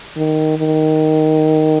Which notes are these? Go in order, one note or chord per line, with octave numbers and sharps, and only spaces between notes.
D#3
D#3